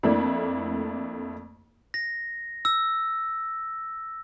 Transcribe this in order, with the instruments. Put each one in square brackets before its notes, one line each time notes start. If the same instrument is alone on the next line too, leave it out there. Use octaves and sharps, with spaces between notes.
[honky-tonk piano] F2 A3 A#3 D4 E4
[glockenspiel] A#6
E6